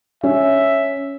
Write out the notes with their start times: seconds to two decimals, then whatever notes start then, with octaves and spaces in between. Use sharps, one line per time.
0.23 C#4 E5